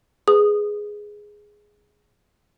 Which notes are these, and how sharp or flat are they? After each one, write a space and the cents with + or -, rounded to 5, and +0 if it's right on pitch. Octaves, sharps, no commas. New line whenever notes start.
G#4 +0 B4 +15 D#6 -20